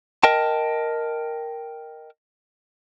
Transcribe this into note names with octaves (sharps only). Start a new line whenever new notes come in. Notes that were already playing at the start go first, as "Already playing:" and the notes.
A#4 D#5 G5 A5